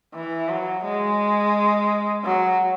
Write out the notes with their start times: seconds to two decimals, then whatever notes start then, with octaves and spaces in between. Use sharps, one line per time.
0.14 E3
0.49 F#3
0.85 G#3
2.24 F#3